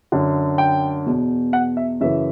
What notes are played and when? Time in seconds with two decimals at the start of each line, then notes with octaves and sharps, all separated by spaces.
0.12 F#2 D3
0.58 G5
1.06 E2 B2
1.53 F#5
1.77 E5
2.00 F#2 C#3 E3 E5